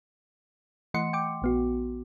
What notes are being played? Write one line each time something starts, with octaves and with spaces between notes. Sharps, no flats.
E3 A3 D#5 F#5 C6 C#7
G5 D6
A#1 B3 F#4